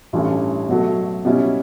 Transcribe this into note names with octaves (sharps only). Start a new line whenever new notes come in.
A1 G2 E3 A3 C#4
B2 F#3 A3
B2 G3 C#4 E4